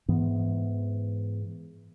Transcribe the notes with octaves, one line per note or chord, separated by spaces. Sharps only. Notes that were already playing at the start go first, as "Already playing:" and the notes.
G#2 E3 B3